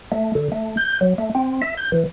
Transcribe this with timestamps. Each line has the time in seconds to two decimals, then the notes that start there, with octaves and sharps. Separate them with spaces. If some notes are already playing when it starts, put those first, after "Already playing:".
0.12 A3
0.35 D3
0.52 A3
0.77 G6
1.01 F#3
1.18 A3
1.35 C4
1.62 E5
1.77 G6
1.92 E3